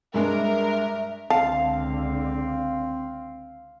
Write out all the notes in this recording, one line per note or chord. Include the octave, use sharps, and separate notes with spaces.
G2 G#3 D4 A#4 E5
C#2 D3 C4 F5 A5